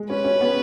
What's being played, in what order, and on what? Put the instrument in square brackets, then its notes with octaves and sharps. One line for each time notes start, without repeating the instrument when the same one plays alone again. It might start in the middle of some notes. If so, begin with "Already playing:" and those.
Already playing: [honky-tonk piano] G#3
[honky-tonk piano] C#4 [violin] B4
[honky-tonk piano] C#4
B3